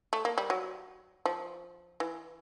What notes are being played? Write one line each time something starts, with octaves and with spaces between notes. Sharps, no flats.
A3
A#3
G3
F#3
F3
E3